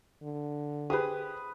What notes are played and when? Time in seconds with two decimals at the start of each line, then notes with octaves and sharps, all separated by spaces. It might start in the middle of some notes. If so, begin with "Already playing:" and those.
0.23 D3
0.90 G4 G#4 B4 D#6